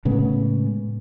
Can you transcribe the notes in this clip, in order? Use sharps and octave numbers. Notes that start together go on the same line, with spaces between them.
A2 C#3 G#3 B3